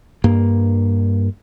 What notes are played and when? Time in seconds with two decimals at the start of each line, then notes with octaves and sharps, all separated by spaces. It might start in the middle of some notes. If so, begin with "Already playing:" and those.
0.24 G2 A#3